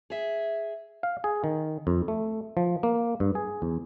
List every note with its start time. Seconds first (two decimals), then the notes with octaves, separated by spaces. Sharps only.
0.10 G#4 E5
1.03 F5
1.24 G#4
1.44 D#3
1.87 F2
2.08 A3
2.57 F3
2.83 A#3
3.20 G2
3.35 G#4
3.62 E2